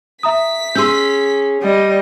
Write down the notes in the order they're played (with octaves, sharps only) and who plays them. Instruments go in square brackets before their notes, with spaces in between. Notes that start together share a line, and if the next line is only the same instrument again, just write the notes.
[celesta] E5 A#5 D#6 [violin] B6
[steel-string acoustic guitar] C#4 G#4 [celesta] C6 E6 G6
[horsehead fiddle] G3 [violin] D#5